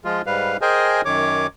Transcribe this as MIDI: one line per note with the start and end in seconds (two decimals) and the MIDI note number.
0.05 0.22 53
0.05 0.22 56
0.05 0.22 65
0.26 0.57 44
0.26 0.57 55
0.26 0.57 71
0.26 0.57 77
0.61 1.01 68
0.61 1.01 70
0.61 1.01 72
0.61 1.01 75
0.61 1.01 79
0.61 1.01 80
1.05 1.47 42
1.05 1.47 51
1.05 1.47 73
1.05 1.47 86